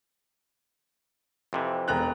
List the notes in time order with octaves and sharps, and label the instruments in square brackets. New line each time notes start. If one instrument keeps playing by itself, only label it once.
[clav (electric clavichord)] F2 C3 E3
[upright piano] E1 A#5 F#6